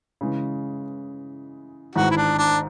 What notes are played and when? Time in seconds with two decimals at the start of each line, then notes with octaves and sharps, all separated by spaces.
0.21 C#3 E3 G#3
1.95 G#1 G#2 E3 F#4
2.11 E4
2.17 D4
2.38 D4